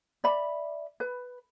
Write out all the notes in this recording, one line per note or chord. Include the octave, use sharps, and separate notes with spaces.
D5 E5 B5
B4